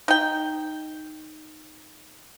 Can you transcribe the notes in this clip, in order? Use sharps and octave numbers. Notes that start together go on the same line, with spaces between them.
D#4 G5